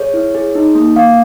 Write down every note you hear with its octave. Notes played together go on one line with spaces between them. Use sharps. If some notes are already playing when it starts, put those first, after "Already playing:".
Already playing: G#4 C#5
E4
G#4
D#4
A#3
A#3 F5